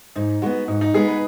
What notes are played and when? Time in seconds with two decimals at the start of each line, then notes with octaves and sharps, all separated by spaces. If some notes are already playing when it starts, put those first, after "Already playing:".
0.16 G#2 D#4
0.42 G#3 B3 F#4
0.68 G#2 D#4
0.81 D#4
0.94 G#3 B3 G#4
1.08 B4